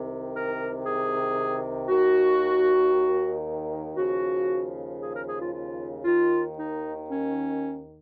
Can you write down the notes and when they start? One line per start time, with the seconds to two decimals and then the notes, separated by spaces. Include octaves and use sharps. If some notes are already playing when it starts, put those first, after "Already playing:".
Already playing: C2 C3 D#3
0.34 A#4
0.86 G#4
1.89 D#2 D#3 F#4
3.97 D#2 C#3 F3 F#4
5.01 G#4
5.13 A#4
5.26 G#4
5.40 F4
5.53 F4
6.04 D#2 D#3 F4
6.57 D#4
7.08 C#4